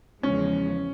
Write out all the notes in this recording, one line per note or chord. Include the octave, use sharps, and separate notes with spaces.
E2 C#3 F3 G#3 C#4